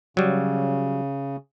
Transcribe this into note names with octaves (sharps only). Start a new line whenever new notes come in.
C#3 F#3 G3